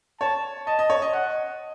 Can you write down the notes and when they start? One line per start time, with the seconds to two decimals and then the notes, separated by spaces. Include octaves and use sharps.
0.21 C#5 A5
0.67 D#5 A5
0.79 D#5
0.90 C#5
1.02 D#5
1.13 D#5 F#5